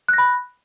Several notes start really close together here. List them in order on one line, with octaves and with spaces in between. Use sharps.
F#6 A#6 B5